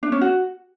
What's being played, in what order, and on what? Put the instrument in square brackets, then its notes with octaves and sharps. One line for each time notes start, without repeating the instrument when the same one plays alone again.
[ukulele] D4
C#4
F#4